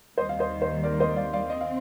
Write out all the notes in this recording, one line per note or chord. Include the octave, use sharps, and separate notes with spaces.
D#2 D#3 G3 C5 D#5
F5
C5 D#5
C5 D#5
A#4 D5
C5 D#5
D5 F5
D5 F5
C4 D#5
F5